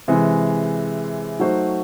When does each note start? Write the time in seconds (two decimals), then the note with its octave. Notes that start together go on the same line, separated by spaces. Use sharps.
0.08 C3 E3 G#3
1.40 F#3 A3 D#4 F#4 C5